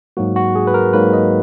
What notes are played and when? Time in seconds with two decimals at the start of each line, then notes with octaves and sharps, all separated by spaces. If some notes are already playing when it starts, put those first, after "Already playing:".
0.17 G#2 F#3 A#3 F#4
0.36 F#4
0.55 G#4
0.67 B4
0.74 A#4
0.93 G#2 F#3 A#3 B4
1.13 D#5